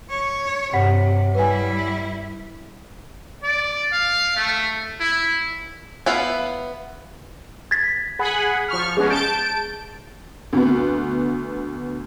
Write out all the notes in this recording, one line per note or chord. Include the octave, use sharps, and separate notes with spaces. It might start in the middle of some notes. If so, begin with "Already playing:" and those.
C#5
G2 C3 C#5 F#5 B6
G3 E4 B4 G#5
D5
F5
A3
E4
B3 E4 B4 F5
G#6 A6 B6
G#4 F#5 B5
F3 C#6 F6
G#3 B3 C#4 G#4
A5 G6 D7
D2 B3